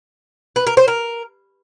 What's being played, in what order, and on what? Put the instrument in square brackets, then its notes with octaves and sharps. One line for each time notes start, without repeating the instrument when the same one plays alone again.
[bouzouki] B4
A#4
C5
A#4